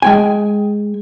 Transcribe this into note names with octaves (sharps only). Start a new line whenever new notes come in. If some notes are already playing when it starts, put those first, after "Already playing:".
G#3 G5 G#5